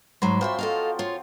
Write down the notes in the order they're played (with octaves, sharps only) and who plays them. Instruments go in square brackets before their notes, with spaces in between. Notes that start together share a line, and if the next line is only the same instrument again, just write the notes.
[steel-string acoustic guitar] G#2 F#3 [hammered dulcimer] F#4 B5 C6
[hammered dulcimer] F3 F#3 C4 [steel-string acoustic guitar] C5 C#5 E5
[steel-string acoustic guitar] A4 D#5 F5
F4 C#5